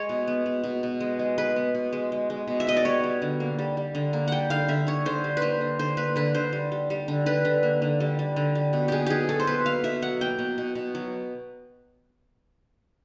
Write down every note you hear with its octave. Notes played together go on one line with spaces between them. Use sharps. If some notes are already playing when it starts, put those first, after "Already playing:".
Already playing: G#3 C#5
B2
B3
B2
B2
B2
G#3
G#3
G#3 B4
B3
B2
G#3
G#3
G#3
B2
E5
B2 D#5
D5
G3 C#5
G3
D3
A#3
G3
G3
D3
A#3
G3 F#5 G5
D3 F5
D3 E5
D3 C#5
D3 C5
G3
B4
A#3 C5
D3
D3 C5
A#3 B4
D3 B4
D3 C5
G3
G3
G3
D3
D3 B4
D3
A#3
D3
G3
G3
D3
G3
B2
B2 G4 G#4
F#3 G4 G#4
B2 A4
C5
B2 B4
A#3 F5
B2 E5
F#3 F#5
A#3 G5
B2
B2
B2
F#3